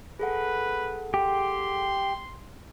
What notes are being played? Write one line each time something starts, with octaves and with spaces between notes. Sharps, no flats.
G#4 A4 B4 F#5
G4 C6